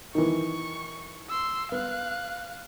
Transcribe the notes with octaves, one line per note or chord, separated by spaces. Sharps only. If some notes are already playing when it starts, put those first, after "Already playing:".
D#3 E3 C#6
C6 E6
B3 F5 F#6